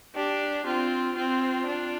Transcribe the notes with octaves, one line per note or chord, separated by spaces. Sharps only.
D4 G4
C4 F4
C4 F4
D4